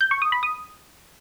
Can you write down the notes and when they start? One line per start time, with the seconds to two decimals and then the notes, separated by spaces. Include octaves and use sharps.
0.01 G6
0.11 C#6
0.22 D#6
0.32 B5
0.43 D#6